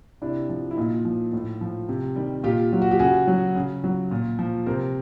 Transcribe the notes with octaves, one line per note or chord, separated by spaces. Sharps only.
C3 D4 E4
F3
E4
A#2 D#4 F4
F3
A2
F3
C3
D#3 G3
A#2 F4 G4
F#3 F4
F#4
G4
C#3 F#4 G#4
F#3
C#3
F#3
A#2
F3
C3 A#4 C5